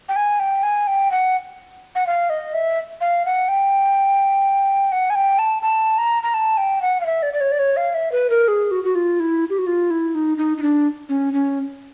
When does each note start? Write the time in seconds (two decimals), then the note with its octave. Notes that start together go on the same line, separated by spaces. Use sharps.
0.09 G5
0.16 G#5
0.40 G5
0.63 G#5
0.87 G5
1.11 F#5
1.95 F#5
2.07 F5
2.30 D#5
2.54 E5
3.01 F5
3.25 F#5
3.48 G5
4.92 F#5
5.10 G#5
5.15 G5
5.39 A5
5.62 A5
5.98 A#5
6.23 A#5
6.34 A5
6.57 G5
6.82 F#5
7.01 F5
7.06 E5
7.23 D5
7.33 D5
7.41 C#5
7.52 D5
7.59 C#5
7.77 F5
7.94 E5
8.12 B4
8.30 A#4
8.48 G#4
8.71 F#4
8.84 F#4
8.95 F4
9.20 E4
9.50 G4
9.58 F#4
9.67 F4
9.90 E4
10.15 D#4
10.38 D#4
10.58 D#4
10.62 D4
11.09 C#4
11.33 C#4